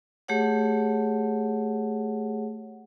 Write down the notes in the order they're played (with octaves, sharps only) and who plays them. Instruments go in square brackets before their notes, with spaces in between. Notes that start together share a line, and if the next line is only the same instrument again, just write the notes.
[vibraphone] A3 G4 G#4 C#5 F#5